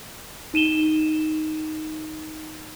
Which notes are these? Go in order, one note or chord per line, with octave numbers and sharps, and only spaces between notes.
D#4 D#7 E7 G7